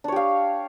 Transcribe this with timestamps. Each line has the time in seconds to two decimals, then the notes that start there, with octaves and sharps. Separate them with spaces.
0.04 D4
0.08 C#5
0.12 G4
0.16 F5